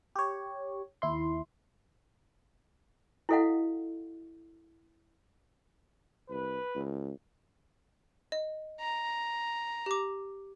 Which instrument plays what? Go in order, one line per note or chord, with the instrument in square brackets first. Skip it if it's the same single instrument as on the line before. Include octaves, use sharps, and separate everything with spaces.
[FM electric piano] G4 C#5
D#2 E4 C6
[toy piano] E4 F#4 A4 D#5 F5 F#5
[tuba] C2 [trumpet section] B4
[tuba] C#2
[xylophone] D#5
[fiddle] A#5
[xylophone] G4 D6